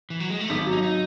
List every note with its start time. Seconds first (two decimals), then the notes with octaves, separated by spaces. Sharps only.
0.10 E3
0.20 F#3
0.30 G#3
0.40 A3
0.50 G#1 B3
0.66 F#3
0.72 D#4
0.83 D#4